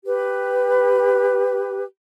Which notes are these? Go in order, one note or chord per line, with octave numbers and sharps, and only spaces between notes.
G4 B4